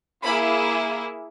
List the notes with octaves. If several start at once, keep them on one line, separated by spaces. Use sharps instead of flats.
A#3 E4 G#4 B5